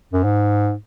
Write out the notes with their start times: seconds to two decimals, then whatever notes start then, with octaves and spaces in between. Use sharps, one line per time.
0.13 F#2
0.24 G#2